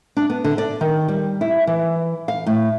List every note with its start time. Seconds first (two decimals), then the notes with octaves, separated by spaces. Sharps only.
0.17 D4
0.30 B3
0.44 D3
0.58 D5
0.81 D#3
1.08 G3
1.41 E4
1.67 E3
2.28 F5
2.46 A2